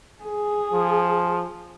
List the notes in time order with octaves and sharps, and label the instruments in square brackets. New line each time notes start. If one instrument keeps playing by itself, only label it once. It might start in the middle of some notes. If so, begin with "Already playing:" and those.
[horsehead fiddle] G#4
[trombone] F3